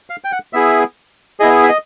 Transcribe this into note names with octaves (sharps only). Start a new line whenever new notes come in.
F5
G5
F#5
B3 E4 G#4 E5
B3 E4 G#4 D#5
E5
D#5